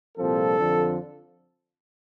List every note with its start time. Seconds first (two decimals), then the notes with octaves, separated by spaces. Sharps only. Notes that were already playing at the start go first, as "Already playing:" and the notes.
0.17 C2 A#2 F3 C4 A4
0.58 F2 D3 F3